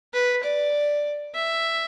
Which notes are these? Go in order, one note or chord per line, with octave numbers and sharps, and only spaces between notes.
B4
D5
E5